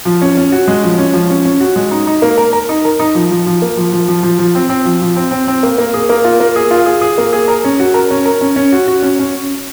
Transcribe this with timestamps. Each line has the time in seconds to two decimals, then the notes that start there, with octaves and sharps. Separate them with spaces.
0.05 F3
0.21 C#4
0.37 C#4
0.52 F#4
0.68 G#3
0.83 F3
0.98 C#4
1.13 F3
1.30 C#4
1.45 C#4
1.60 F#4
1.76 G#3
1.91 D#4
2.07 D#4
2.22 A#3
2.38 A#4
2.53 A#4
2.69 D#4
2.85 A#4
2.99 D#4
3.15 F3
3.31 F3
3.47 F3
3.62 A#3
3.77 F3
3.92 F3
4.08 F3
4.23 F3
4.39 F3
4.55 C4
4.69 C4
4.85 F3
5.01 F3
5.16 C4
5.31 C4
5.47 C4
5.63 A#3
5.78 A#3
5.94 G#4
6.09 A#3
6.24 F4
6.40 A#3
6.56 G#4
6.71 F4
6.86 G#4
7.01 G#4
7.18 A#3
7.33 G#4
7.48 A#4
7.64 C#4
7.80 F#4
7.94 A#4
8.11 C#4
8.25 A#4
8.41 C#4
8.56 C#4
8.72 F#4
8.88 F#4
9.02 C#4
9.19 C#4